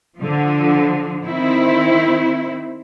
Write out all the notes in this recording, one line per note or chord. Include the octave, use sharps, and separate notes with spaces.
D3 F3
D#3 C4 E4